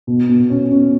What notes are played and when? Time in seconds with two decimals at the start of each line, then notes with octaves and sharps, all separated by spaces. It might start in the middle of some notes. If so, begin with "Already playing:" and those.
0.07 B2
0.29 B2
0.50 C#4
0.71 C#4